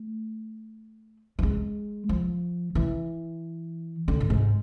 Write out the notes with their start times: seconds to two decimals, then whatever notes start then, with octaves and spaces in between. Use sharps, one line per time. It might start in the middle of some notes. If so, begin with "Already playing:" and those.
Already playing: A3
1.39 F3
1.43 G#3
2.09 F3
2.75 E3
4.08 D3
4.20 A2
4.30 G#2